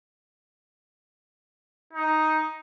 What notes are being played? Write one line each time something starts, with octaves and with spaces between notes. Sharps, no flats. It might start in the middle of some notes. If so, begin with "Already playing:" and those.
D#4